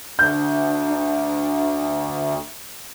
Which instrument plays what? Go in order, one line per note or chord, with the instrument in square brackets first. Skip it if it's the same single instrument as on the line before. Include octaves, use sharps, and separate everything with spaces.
[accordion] D2 [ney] D4 [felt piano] G6